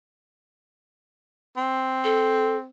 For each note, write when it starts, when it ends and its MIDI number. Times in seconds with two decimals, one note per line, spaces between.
1.57 2.68 60
2.04 2.56 69